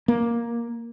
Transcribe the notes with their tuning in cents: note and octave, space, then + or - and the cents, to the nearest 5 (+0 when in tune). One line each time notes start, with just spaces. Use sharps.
A#3 +10